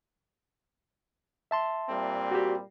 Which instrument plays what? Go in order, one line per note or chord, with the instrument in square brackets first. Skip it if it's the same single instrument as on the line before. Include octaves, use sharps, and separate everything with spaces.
[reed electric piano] E5 A5 C6
[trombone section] A#2 G3 C4
[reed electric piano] F#4 G4